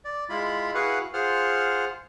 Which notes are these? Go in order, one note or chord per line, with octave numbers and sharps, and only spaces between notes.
D5
G#3 E4 F4 B5
E4 F#4 G#4 B4 F5 F#5
F4 G#4 C5 F#5 F6